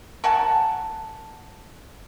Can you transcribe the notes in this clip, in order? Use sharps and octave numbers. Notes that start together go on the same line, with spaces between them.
A#4 F#5 G#5 A5